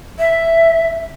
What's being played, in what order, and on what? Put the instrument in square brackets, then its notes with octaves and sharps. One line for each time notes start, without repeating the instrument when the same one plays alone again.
[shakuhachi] E5